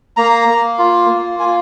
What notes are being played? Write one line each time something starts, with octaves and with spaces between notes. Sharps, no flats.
A#3 A#5
A#3
F4
A#3
F4 G#5